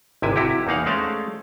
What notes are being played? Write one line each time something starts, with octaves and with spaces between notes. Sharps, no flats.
G#1 C3 E4 G#5
C3 E4 F#4 G4
E2 A#3 D#4 F5 F#5
G#3 A3 C#4 C5 D5 F5